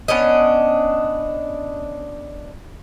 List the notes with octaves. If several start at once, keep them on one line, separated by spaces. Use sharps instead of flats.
B3 C#4 D4 D#5